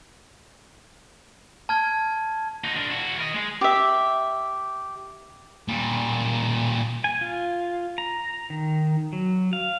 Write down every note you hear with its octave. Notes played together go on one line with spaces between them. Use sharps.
A5 F6 G#6
D#4 F#4
D4 A#4
E4 F#4
A#4 D#5
G#3
G4 E5
A#2 G3
G#5
F4
A#5
D#3
F#3
F5